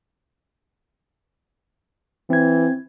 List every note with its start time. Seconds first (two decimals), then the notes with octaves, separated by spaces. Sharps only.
2.30 E3 C4 G#6